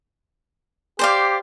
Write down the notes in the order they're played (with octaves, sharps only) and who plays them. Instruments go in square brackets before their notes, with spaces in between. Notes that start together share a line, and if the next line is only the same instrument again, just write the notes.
[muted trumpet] G4 [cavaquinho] C5 D5 F5